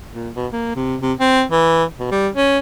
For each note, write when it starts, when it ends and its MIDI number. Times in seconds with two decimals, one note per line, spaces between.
0.13 0.30 46
0.35 0.47 47
0.53 0.72 58
0.76 0.96 48
1.02 1.13 48
1.20 1.43 60
1.52 1.84 52
1.99 2.10 47
2.11 2.29 55
2.35 2.58 61